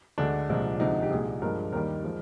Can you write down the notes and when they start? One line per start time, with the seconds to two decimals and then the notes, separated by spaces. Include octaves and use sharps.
0.18 D2 D3 G#3 D4
0.49 C2 A#2 F3 G#3
0.80 D2 C3 F3 G#3 D#4
1.03 G4
1.10 C2 A#2 G#3 G#4
1.42 G2 F3 G#3 A#4
1.73 D#2 D#3 G3 A#4
2.04 F3 G#3